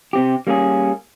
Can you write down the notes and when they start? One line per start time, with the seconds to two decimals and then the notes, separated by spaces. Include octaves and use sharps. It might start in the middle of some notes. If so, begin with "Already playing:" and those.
0.13 C3 C4 G4
0.47 G3 A#3 C#4 G4 G#4